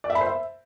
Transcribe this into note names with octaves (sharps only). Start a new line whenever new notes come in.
D5
E5
B5
C5
E5